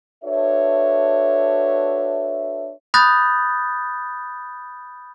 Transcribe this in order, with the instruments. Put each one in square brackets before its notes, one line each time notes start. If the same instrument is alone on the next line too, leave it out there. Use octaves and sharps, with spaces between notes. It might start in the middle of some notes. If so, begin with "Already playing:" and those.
[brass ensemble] D4 F#4 A4 B4 C#5 E5
[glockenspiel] B5 D#6 F#6 G6 A6 A#6